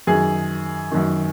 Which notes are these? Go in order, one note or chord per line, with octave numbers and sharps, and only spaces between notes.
F#2 D#3 G#4
F#2 D#3